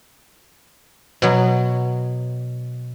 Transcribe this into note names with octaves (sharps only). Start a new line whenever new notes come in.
B2 F#3